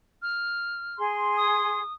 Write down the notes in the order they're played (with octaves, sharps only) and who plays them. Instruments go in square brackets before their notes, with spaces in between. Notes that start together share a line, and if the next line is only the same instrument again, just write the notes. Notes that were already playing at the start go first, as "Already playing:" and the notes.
[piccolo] F6
[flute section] G#4 C6
[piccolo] D#6